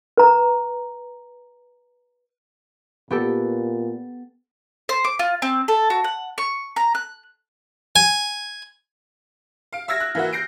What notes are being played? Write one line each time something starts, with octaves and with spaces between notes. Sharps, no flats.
B4 A#5
A#2 B3 G4 A4
C5
D6
F4
C4
A4
F#4
F#5
C#6
A#5
F#6
G#5
F5 D7
E5 E6 F6 G#6 A#6
F#6
E3 A#3 F#4
G6 A#6 C7 D7